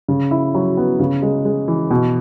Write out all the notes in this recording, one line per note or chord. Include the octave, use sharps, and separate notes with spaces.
C#3
E4
F#3
B3
C#3
G#3
G#3
E3
B2